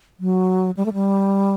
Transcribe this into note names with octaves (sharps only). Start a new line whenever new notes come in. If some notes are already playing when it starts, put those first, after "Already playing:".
F#3
G3
A3
G3